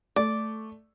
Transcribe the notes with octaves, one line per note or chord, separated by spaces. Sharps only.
A3 D5